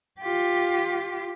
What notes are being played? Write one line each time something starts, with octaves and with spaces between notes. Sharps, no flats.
F4 G4